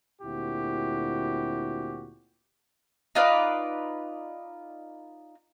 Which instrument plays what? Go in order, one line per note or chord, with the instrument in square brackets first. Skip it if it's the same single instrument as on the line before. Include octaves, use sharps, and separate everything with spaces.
[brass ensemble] D2 A#2 C4 E4 F#4 G4
[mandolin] D#4 F4 B4 D5